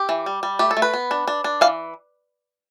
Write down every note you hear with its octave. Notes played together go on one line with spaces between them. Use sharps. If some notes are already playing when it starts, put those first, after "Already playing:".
Already playing: G4
E3
G3
G3
A3 G4
A4
A3
B4
B3
D4
D4
D4
E3 F5